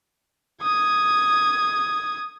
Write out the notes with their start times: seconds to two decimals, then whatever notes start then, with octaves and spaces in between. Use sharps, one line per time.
0.62 D#6 G#6